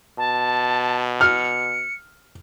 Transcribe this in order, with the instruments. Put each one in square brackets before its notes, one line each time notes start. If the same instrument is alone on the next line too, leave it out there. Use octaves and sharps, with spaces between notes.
[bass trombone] B2 [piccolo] A5
[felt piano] F6 [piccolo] C#7